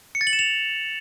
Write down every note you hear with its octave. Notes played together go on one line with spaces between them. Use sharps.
C#7
A6
F#7
E7
F7